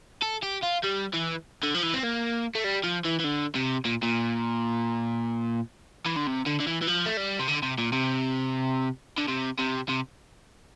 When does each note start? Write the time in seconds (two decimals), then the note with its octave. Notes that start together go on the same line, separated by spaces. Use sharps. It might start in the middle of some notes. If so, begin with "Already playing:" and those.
0.22 A4
0.42 G4
0.63 F4
0.83 G3
1.13 E3
1.63 D3
1.75 F3
1.83 E3
1.95 C4
2.04 A#3
2.55 A3
2.64 G3
2.84 F3
3.05 E3
3.20 E3
3.24 D3
3.55 C3
3.85 A#2
4.03 A#2
6.06 E3
6.17 D3
6.27 C3
6.46 D3
6.60 D3
6.67 E3
6.81 E3
6.87 F3
7.06 A3
7.17 G3
7.39 C3
7.48 D3
7.63 C3
7.78 A#2
7.93 C3
9.18 D3
9.28 C3
9.59 C3
9.89 C3